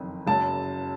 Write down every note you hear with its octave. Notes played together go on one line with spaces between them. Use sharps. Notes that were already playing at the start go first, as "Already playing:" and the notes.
Already playing: F#1 F2 D#3
F#1 F#2 C#3 F#3 A5